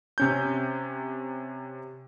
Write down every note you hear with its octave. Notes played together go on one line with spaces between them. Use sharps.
C3 C#4 G6